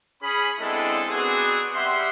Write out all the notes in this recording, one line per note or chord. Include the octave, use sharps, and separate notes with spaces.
C#4 G#4 B5
G#3 B3 C4 D4 E4 A4
B3 C4 D4 F#4 G#4
G3 G4 E5 F#5 C6